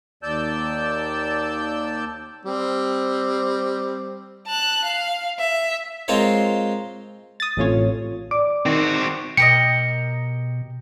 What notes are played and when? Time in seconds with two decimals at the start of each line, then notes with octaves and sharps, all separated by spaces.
0.23 D#2 D5 A5 E6 G6
2.45 G3 C4
4.47 A5 F#6
4.85 F5
5.39 E5
6.08 G#3 C4 F4 A#4 C5 C#5
7.40 D#6 A6
7.57 A1 C3 A3 C#4 F4 C#5
8.31 D5 D6
8.66 D#3 C4 F#4
9.37 B2 G4 A#4 D#5 C#7